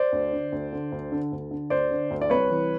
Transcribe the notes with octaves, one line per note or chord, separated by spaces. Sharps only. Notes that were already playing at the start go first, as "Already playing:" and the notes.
Already playing: C5 D5
D2
D3
D2
D3
D2
D3
D2
D3
D2 C5 D5
D3
D2
D5
C2 B4 C#5
E3